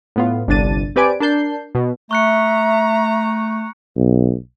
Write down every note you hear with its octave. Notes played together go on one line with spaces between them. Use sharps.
A2 B3 F4
G1 C2 D4 A6 D#7
C4 G4 B4 D5 G#5 D7
D4 A#4 A5 G6 C7
B2
A3 E5 A#5 C#6 F#6 C#7
B1